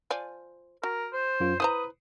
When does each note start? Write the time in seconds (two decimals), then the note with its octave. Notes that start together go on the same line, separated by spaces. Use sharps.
0.11 F3 D5 G#5
0.83 F#4 A#4
1.13 C5
1.40 F#2 F4
1.60 E4 B4 C5 A#5 D#6